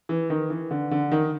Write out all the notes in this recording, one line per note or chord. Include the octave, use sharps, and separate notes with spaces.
E3
D#3
E3
D3
D3
D#3